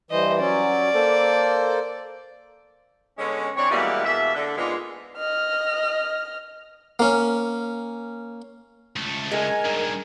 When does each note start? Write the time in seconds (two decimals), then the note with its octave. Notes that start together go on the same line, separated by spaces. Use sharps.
0.11 G2 E3 C5 D#5
0.40 F#3 C#4 D5
0.95 A#3 A4 C5
3.19 D3 G#3 B3 C#4
3.57 E3 C4 D4 C#5
3.71 B2 E3 G3 G#3 A#3 B3
4.05 E2 B2 A#3 E5
4.35 D3
4.57 G#2 G#3 A#3 B3 D4 F4
5.18 D#5 F6
6.99 A#3 C#4
8.96 C#2 A3
9.32 G#3 A#4 G#5
9.65 G2 D#3